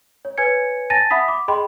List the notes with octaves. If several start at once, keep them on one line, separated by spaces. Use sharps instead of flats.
C#5
B4 C#5 G#5 G#6 C#7
G#5 A5 A6 A#6 D#7
E5 F#5 B5 D#6 B6
D6
G#4 D#5 G5 B5 C6